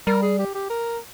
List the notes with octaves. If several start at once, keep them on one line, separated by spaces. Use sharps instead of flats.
G3 A#4
G#4
G4
G4
A#4